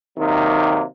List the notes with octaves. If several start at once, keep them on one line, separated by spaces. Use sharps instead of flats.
C3 D#3 F#3 A#3